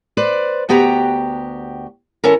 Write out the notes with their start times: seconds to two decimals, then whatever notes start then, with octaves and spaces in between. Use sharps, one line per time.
0.17 B4 C5 D5
0.69 D2 B3 F#4 G4 G5 A#5
2.24 E3 C#4 A4 A#4